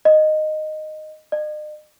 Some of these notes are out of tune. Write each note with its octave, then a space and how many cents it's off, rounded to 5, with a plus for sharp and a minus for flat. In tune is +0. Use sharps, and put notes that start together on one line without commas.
D#5 -10
D#5 -45